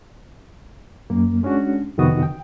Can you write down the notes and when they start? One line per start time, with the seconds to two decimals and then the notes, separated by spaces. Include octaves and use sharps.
1.10 F#2 A#3
1.43 G#3 C#4 D4 F#4
1.98 F2 C3 D#3 B3 F#4 D#6
2.23 G5